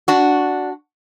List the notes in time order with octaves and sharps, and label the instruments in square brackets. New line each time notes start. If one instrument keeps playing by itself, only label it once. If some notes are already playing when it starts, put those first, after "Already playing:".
[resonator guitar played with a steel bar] D4 F#4